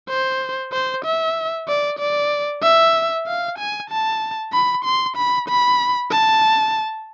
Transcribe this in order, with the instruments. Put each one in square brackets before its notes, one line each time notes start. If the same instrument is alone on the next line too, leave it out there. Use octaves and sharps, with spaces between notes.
[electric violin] C5
C5
E5
D5
D5
E5
F5
G#5
A5
B5
C6
B5
B5
A5